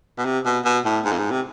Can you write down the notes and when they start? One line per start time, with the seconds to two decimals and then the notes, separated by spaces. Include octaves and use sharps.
0.18 B2
0.25 C3
0.45 B2
0.65 B2
0.85 A2
1.05 G#2
1.12 F2
1.18 G#2
1.31 C3